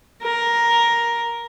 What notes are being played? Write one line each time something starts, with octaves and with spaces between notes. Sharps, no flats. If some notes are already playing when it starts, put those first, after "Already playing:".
A#4